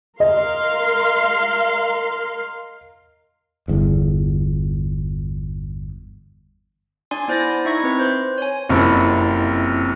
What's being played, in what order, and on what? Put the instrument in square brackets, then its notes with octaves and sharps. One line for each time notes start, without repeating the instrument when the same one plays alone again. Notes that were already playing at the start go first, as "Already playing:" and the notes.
[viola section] A#4 F5 C6 [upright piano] D#5
[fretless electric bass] G1 E2
[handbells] D4 D5 G#5 C6
B3 E4 C5 D5 A6 A#6
D#4 E4 E5 C#6 G#6 A#6
C4 B4
C5 C6
C#5 G#5
[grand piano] F#1 F2 C3 E4